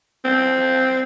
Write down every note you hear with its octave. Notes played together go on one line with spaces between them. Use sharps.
C4